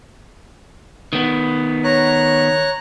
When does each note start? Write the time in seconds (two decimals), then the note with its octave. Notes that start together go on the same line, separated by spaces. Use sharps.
1.13 D#3 B3
1.84 C#5 A#5 F#6